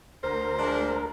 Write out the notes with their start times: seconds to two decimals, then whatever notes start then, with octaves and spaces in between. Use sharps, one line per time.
0.23 D2 A#4 C5
0.58 F3 G#3 D4